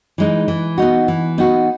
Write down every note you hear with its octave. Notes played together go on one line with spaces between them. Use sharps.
E3 G#3 D#4
E3
B3 D#4 F#4
E3
B3 D#4 F#4